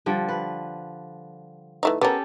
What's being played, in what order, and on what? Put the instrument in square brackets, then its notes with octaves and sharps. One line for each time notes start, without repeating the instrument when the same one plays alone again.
[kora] D3 F3 G3
B4
[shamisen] E3 A3 D#4
[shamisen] B3 A#4 [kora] C#4 G4 A4